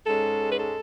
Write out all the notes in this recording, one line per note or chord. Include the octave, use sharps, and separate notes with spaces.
G#2 G#3 C#4 A4
B4
A4